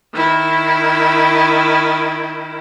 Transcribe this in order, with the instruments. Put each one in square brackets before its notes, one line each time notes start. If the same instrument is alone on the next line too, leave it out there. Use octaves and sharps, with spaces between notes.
[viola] D#3 E4